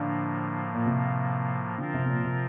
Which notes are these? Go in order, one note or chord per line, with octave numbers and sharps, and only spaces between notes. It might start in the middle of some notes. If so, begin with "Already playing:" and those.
Already playing: A2 D3 F3 A#3
A#2
C3
D3 F3 C4 F4 A#4
C3
C3
A#2
C3